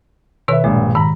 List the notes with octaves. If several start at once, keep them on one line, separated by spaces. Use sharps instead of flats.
B2 D#3 B4 C#5 E5
A#1 G2 G#3
G#2 D#3 A#5 B5